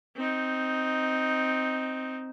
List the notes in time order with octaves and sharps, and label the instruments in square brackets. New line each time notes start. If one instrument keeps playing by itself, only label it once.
[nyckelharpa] C4 D#4